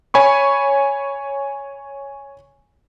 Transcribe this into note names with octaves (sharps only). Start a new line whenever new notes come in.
C#5 G#5 B5 C#6